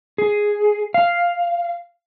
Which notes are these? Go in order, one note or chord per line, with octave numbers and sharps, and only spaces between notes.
G#4
F5